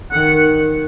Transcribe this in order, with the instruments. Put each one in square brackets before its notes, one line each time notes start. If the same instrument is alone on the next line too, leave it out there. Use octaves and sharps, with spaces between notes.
[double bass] D#3 [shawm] F#5